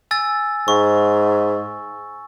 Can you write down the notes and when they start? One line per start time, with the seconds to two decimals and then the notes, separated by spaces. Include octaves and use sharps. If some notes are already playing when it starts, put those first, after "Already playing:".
0.11 G#5 E6 A6
0.68 G#2 C#6